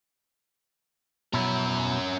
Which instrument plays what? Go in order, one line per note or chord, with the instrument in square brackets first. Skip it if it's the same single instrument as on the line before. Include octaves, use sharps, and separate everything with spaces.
[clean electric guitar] B2 E4 [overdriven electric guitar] C#4 A#4